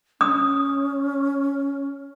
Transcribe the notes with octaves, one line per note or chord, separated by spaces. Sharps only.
C#4 D#6